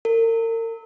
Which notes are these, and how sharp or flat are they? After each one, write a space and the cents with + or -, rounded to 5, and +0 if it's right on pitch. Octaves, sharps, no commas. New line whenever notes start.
A#4 -40